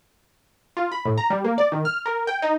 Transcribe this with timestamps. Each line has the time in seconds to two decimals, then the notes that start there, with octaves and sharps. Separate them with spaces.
0.77 F4
0.92 B5
1.06 A2
1.18 A#5
1.30 G3
1.44 A#3
1.58 D5
1.72 D#3
1.85 F6
2.06 A#4
2.27 G5
2.42 D#4